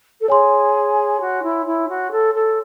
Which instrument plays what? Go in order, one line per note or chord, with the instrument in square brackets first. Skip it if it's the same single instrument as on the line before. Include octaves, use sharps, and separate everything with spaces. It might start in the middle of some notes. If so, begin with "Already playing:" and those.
[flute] A4
[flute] G#4 [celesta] C#5 G#5 C6
[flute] F#4
E4
E4
F#4
A4
A4